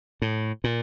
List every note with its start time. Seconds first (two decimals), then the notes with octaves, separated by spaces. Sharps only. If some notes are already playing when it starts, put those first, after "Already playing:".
0.22 A2
0.64 A#2